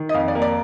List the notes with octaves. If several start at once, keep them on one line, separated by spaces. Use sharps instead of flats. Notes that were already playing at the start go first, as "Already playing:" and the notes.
Already playing: D#3
D#5
F2 F5
D5
A#3
D5